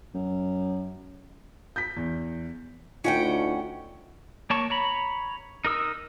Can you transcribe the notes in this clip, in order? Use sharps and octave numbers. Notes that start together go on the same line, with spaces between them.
F#2
G6 B6
E2
D2 C#4 D#4 F4 D#5 F#5 G5
A#3 C#5 A5 C#6
C#5 A#5 B5
D#4 A#4 D#6 E6